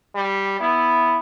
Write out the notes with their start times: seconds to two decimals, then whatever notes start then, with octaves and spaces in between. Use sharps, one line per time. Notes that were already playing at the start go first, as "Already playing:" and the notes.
0.15 G3
0.61 B3 E4